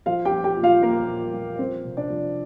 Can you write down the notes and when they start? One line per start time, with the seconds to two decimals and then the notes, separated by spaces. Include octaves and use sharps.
0.06 F3 F4 F5
0.25 G4 G5
0.32 F3
0.44 G4 G5
0.57 A#2
0.63 F4 F5
0.82 F3 A#3 A#4
1.08 A#2
1.34 F3
1.58 F3 C4 C5
1.85 C3
1.97 D4 D5
2.10 F3